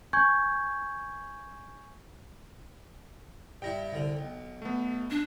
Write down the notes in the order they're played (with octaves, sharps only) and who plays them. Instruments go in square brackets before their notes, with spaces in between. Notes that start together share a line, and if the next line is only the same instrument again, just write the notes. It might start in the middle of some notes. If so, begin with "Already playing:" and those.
[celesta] G#5 C#6 G6 G#6
[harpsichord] G2 E4 [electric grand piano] G5 A#6
[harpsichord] C2 D3
B1
[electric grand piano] A3 B3
[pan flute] D4